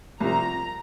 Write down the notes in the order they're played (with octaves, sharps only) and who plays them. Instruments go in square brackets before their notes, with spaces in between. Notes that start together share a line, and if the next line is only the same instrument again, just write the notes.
[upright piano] C2 C3 F3 C4 [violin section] A#5